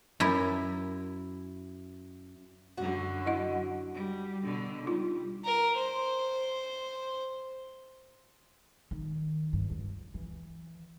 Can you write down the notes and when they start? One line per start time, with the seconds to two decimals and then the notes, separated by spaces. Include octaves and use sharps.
0.20 F#2 E4
2.77 F#2 D3 F#4
3.26 E4 D#5 F#5
3.94 G3
4.44 B2 D3
4.86 G3 D#4 F4
5.44 A#4
5.77 C5
8.91 D#3
9.53 G2
9.70 C#2
10.14 E3